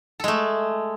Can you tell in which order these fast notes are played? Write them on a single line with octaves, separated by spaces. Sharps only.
A4 G#3 A3